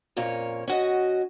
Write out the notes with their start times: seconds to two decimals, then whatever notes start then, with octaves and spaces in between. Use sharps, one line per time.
0.17 F2 A#2 A#3 C#4 C#5
0.68 C#4 F#4 D#5